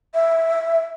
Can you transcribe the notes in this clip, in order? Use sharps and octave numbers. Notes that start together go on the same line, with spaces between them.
E5